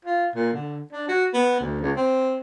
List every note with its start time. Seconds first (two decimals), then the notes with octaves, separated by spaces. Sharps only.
0.05 F4
0.35 A#2
0.53 D3
0.92 D4
1.08 F#4
1.34 B3
1.60 D2
1.82 C#2
1.96 C4